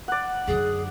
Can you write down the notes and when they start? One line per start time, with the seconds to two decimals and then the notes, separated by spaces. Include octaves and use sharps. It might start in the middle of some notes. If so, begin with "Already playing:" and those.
0.08 D5 F#5
0.47 F#2 D3 G#4